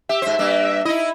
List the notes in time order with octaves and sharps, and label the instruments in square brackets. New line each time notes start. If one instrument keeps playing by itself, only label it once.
[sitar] G4 [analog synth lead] E5
[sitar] G#2 C5
G2 A#3
[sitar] D#4 D#5 [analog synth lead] E4